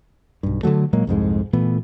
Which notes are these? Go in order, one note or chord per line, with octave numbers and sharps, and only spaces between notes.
B1 G2
D3 F3 F#3 A3
A#2 F#3 G#3 A#3
C2 F2 G#2 G#3
A#2 E3 A3 B3